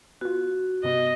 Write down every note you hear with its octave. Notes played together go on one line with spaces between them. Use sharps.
B3 F4 F#4
G2 C3 B3 D#5